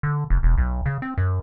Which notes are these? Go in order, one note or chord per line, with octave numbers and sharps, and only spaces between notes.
D3
F1
E1
B1
C#3
C4
F#2